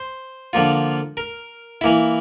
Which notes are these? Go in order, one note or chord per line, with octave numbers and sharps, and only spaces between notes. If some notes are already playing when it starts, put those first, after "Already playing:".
Already playing: C5
D3 F3 A#3 F4
A#4
E3 A#3 E4